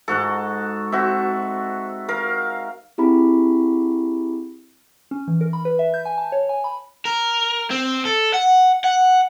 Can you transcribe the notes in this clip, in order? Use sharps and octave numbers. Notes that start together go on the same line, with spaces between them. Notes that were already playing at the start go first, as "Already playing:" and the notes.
G#2 F#4 A4 F#5
C4 F#4 E5
A#4 F5
C4 E4 G4 G#4 B5
C#4
E3
A#4
B5
B4
E5
G6
G#5
A5
C#5
G#5
B5
A#4
C4
A4
F#5
F#5